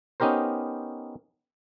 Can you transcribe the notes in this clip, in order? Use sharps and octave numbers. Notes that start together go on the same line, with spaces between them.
B3 C#4 D#4 G4 A#4 C5